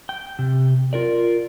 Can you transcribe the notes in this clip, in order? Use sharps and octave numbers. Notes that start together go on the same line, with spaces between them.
G5
C3
F4 A#4 D5